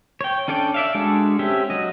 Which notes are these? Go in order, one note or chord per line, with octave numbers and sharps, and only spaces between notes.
C#5 G5
C#4 D4 A4 D5 G5
D5 E5 F5
G#3 D4 F#4 G#4 A4
C4 C#4 G4 E5
F#3 D#5